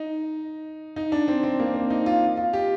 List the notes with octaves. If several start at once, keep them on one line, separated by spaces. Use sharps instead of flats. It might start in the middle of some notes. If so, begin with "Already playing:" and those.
Already playing: D#4
D#4
D4
C4
C4
A#3
C4
D#4
F4
F4
G4